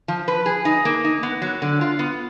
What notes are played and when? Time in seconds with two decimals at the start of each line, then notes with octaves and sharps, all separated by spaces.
0.08 F3
0.28 B4
0.46 G#4
0.65 D#4
0.85 A#3
1.04 D#4
1.23 B3
1.42 F#3
1.62 D3
1.81 F4
1.99 B3